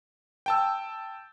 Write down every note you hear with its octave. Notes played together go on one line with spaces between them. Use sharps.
G5 A5 E6